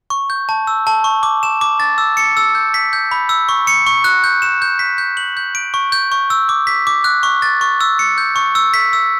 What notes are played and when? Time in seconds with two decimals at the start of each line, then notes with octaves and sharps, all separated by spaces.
0.10 C#6
0.30 G6
0.49 A5
0.67 E6
0.87 A5
1.04 C#6
1.23 D6
1.43 E7
1.61 D6
1.80 A6
1.98 E6
2.17 C#7
2.37 E6
2.55 G6
2.74 B6
2.93 G6
3.11 B5
3.29 E6
3.49 C#6
3.67 C#7
3.86 C#6
4.04 F#6
4.24 G6
4.42 E7
4.62 G6
4.79 B6
4.98 G6
5.17 F#7
5.37 G6
5.55 D7
5.74 C#6
5.92 G6
6.12 C#6
6.30 E6
6.49 D6
6.67 B6
6.87 D6
7.04 F#6
7.23 C#6
7.42 A6
7.61 C#6
7.81 E6
7.99 C#7
8.18 G6
8.36 C#6
8.55 E6
8.74 B6
8.93 E6